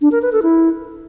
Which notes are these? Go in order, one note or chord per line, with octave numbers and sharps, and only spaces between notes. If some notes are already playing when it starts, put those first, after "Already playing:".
D4
A#4
B4
A4
E4